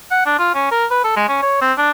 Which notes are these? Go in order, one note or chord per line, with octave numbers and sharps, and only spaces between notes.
F#5
D4
F4
C#4
A#4
B4
A4
G#3
C#4
C#5
C4
D4